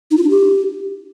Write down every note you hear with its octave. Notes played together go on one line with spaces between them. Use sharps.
D#4
F4
D4
G4